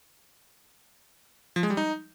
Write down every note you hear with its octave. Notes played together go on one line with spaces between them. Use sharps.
F3
G#3
G3
D#4